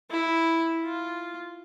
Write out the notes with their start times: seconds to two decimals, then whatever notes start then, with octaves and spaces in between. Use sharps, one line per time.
0.11 E4
0.85 F4